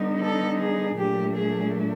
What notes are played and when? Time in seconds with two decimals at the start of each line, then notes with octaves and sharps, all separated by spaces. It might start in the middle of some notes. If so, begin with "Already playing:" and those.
Already playing: D3 G3 B3 D#4
0.21 A4
0.59 G#4
0.98 A#2 F#3 A3 D4 G4
1.36 G#4